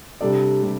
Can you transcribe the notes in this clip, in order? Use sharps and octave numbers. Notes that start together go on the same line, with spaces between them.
C3 G3 D4 A4 D5
C3 G3